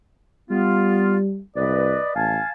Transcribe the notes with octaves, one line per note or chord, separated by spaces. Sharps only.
G3 B3 F4
C2 B4 D5 D#5
A1 F5 G#5 A5